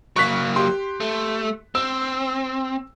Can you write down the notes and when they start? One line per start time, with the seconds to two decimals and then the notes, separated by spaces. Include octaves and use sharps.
0.16 F#3 A#3 C#6 F#6 B6
0.56 G4 C6
1.00 A3
1.75 C4 E6